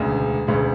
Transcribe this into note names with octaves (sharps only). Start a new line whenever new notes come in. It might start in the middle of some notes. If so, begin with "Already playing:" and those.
Already playing: E1 D2 C#3
E1 D2 C#3